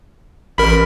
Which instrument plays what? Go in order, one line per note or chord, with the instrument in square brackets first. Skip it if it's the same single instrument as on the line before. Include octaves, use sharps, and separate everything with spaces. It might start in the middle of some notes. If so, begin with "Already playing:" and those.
[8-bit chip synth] A1 A#4 [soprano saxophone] B5